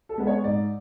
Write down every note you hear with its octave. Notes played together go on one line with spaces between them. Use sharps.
A4
G#3 B3
C#5
G#2 D5